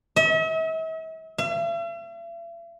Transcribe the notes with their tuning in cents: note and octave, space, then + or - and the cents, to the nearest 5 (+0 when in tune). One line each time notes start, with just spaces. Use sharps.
E5 -45
E5 +45